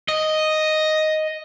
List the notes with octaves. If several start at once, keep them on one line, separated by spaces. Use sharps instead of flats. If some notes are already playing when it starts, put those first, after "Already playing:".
D#5